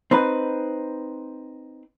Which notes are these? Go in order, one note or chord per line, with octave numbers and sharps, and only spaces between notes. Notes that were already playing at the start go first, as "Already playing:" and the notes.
C4 D#4 B4